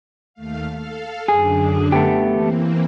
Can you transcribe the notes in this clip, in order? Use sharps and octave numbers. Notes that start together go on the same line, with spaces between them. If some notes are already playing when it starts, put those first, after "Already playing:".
D#2 A3 F5
A4 F5
F#2 D3 D4 G#4
A3 B3 G4
E3 A#3 C4